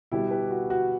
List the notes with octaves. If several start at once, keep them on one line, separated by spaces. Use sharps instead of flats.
B2 G3 B3 E4 G4
G4 B4
F#4
F#4